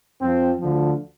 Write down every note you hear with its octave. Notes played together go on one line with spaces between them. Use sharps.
F2 F3 C4
D2 D3 F3